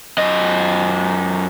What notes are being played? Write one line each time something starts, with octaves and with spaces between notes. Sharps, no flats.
F#2 D#5